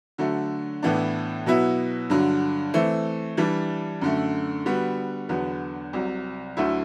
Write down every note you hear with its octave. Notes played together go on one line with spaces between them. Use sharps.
D3 F#3 A3
A2 E3 B3 D4
B2 F#3 B3 E4
G2 D3 F#3
E3 A3 C4
E3 G3 D4
F#2 D3 A3
D3 G3 B3 F#4
E2 D3 F#3 B3
C2 C3 F#3
D2 D3 F#3 A3 E4